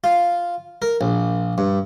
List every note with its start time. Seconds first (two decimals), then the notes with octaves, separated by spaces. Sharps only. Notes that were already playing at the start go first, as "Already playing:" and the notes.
0.04 F4
0.82 A#4
1.01 A#1
1.58 G2